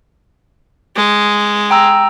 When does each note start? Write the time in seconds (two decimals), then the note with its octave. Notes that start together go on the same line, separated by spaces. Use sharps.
0.96 G#3
1.71 G5 A#5 E6